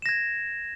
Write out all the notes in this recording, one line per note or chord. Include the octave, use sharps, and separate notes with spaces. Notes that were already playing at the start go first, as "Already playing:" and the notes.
G#6 A#6 E7